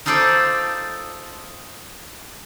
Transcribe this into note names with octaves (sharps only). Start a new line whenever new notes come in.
D#4 F4 A4 C5 D5